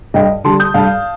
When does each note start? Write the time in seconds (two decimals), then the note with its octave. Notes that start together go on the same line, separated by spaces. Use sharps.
0.14 G2 D#5 G5
0.44 D3 G3 A5 C6
0.60 D#6 G6
0.74 G2 F5 A5